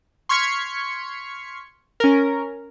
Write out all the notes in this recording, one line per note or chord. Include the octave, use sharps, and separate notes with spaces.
C6 C#6 F6 G#6 B6 C#7
C#4 A#4